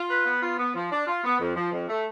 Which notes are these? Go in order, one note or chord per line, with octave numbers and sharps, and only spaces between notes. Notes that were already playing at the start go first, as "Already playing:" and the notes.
Already playing: F4
B4
B3
F4
B3
F3
D4
F4
B3
F2
F3
F2
A3